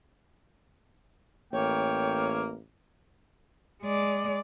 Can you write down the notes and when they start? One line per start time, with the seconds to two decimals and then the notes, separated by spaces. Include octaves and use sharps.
1.53 A1 A#3 C#5 G5
3.82 G#3 D5